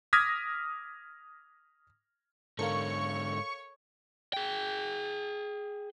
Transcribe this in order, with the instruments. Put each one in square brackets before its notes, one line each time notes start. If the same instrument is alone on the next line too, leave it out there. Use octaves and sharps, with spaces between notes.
[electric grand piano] D6 D#6 F6 G#6 A#6 B6
[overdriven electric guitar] G#2 D3 [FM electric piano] A4 A#4 F5 [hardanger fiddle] C#5 [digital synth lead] C#6
[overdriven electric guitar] G#4 G5